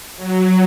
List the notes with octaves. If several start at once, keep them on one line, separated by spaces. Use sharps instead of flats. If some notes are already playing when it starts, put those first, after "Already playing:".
F#3